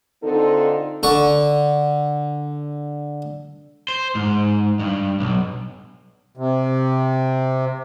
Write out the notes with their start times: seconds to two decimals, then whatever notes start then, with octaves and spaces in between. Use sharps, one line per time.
0.23 D3 C4 D#4 F4 A4
1.03 D3 C#6
3.88 C5
4.15 G#2
4.80 G2
5.20 B1
6.37 C3